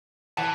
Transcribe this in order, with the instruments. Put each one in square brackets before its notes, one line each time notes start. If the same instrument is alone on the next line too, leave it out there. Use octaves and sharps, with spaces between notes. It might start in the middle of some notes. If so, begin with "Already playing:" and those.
[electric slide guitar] E3 [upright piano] F#5 A5